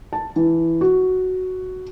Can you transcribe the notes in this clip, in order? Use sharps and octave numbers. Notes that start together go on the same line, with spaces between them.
A5
E3
F#4